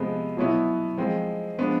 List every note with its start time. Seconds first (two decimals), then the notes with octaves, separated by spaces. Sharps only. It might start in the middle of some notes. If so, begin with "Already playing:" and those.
Already playing: C3 F3 G#3 B3
0.37 B2 F#3 B3 E4
0.97 F3 G#3 C4
1.58 F3 G#3 B3 D4